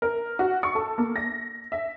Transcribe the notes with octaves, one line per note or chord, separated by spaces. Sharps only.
A#4
F#4
C#6
A4
A#3
A#6
E5